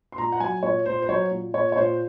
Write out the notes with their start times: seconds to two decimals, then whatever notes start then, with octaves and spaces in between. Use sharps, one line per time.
0.12 C6
0.18 A#2 A#5
0.32 F#5
0.40 F#3 G#5
0.63 A#2 C#5
0.86 A#2 C5
1.02 C5
1.09 F#3 C#5
1.31 A#2
1.54 A#2 C#5
1.72 C#5
1.77 A#2 C5